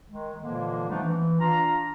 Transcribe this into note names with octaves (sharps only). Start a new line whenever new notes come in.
D#3 G#3
A#2 D3 E3 F3 G#3 A#3
F3 G3 A3 B3 D4 D#4
E3
D4 F4 F5 A#5